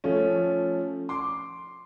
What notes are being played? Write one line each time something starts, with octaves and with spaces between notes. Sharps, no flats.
F3 A3 C#4
C6 D6